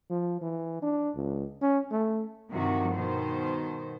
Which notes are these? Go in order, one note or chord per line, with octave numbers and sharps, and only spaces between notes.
F3
E3
D4
C#2
C#4
A3
G2 C3 D#3 F3 F#4
B2 D#3 C5